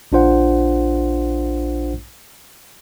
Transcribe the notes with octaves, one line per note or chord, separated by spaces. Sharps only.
A#1 D4 F4 C5 F#5